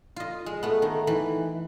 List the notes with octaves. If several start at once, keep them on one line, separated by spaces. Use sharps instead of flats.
F4 D#5
G#3
A3 B3
D#3
E3